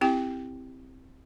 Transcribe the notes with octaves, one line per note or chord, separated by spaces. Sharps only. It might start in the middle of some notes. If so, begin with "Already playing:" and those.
C4 E4 G4 G5